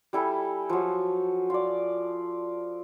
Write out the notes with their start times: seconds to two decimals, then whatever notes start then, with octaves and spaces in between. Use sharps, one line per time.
0.13 G3 E4 A4 G#5
0.70 F3 F#3
1.50 F4 D5